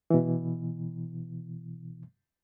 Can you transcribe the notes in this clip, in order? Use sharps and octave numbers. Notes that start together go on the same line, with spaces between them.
B2 E3